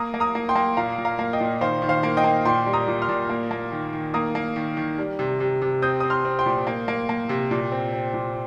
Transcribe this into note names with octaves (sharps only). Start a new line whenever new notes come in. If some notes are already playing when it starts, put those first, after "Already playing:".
Already playing: A#3 A#5 D#6
A#3
A#5 D#6
A#3
G5 C6
A#3
A#2 F5 A#5
A#2
F5 A#5
A#3
D#5 G5
A#2
D#3 C5 F5
D#3
C5 F5
A#3
D#5 G5
A#3
A#2 G5 C6
G3
A#5 D#6
A#2
C6 F6
A#2
A#3
A#3
D#3
D#3
A#3 A#5 D#6
A#3
D#3
D#3
G3
C3
C3
C3
C4 D#6 G6
C4 D#6
C6 F6
C4
G5 C6
A#2
A#3
A#3
A#3
C3
A#2
C4
C4
A#2